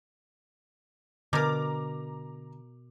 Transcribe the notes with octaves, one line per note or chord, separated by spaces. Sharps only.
B2 D3 A#4 A#5 D6